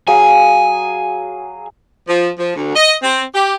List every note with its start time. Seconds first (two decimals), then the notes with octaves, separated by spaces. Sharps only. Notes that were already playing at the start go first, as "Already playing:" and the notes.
0.07 F#3 G#4 F5 G#5
2.08 F3
2.39 F3
2.56 D2
2.76 D#5
3.03 C4
3.35 G4